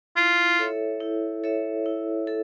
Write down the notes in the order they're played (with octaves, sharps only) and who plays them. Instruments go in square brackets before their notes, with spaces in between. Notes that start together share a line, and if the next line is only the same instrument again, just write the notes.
[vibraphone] E4 [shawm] F4
[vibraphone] A4 C#5 E5
E4
A4 C#5 E5
E4
A4